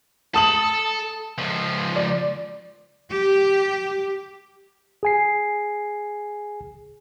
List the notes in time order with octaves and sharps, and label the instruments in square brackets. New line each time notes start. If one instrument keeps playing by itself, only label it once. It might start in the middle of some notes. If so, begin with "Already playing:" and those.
[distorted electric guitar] A4 [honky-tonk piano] A5 D#6 F#7
[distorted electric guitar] C#2 F3
[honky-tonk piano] D5
[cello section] G4
[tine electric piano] G#4 G#5 C7